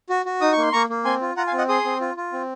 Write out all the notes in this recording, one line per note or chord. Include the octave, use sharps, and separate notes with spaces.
F#4
F#4
D#4 D#6
C#6
A#3 C6
A#3 A#5 C#6
A#3
C4 G#5 C6
F4
F4 F#5 A#5
F5 G#5
C4
D#5 F#5
G#4 C6 D#6
C4
F4
F4
C4